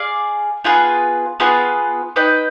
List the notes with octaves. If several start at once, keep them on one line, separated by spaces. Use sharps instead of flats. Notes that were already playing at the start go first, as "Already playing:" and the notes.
Already playing: G#4 D5 F5
B3 F4 G#4 B4
B3 F4 G#4 B4
D#4 B4 D#5 G5